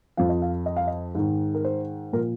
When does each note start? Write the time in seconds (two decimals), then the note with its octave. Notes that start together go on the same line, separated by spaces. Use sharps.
0.17 F2 F3 F5
0.29 D#5
0.42 F5
0.66 D#5
0.77 F5
0.87 D#5
1.15 G#2 D#3
1.55 A#4
1.65 C5
2.13 A#2 F3 A#4